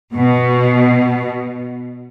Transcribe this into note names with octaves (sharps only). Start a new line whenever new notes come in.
B2